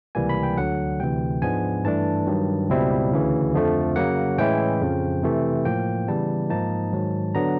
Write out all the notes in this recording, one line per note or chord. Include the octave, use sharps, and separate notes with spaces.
C#2 C3 E3 G3 A#3 G#5
B5
G5
D2 D3 F#3 F#5
D2 C3 E3 G5
G#2 F3 G#3 B3 D4 G#5
G2 E3 A3 D4 A5
G2 D#3 F#3
C#2 B2 G3 C4 E4
D2 C#3 E3
F2 D3 F3 A3
C#3 F#3 A#3 F#5
A2 E3 G#3 C#4 E4 G5
F2 C#3 F3
C3 E3 A3
A2 F3 A#3 G5
C#3 E3 G3 B3 A5
G#2 F3 A#3 D#4 A5
G#2 D#3 F#3
D3 F#3 B3 D4 A#5